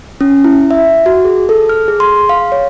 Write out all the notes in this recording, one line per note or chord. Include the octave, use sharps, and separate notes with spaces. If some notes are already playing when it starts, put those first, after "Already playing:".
C#4
E4
E5
F#4
G#4
A4
F6
G#4
C6
F5
C#5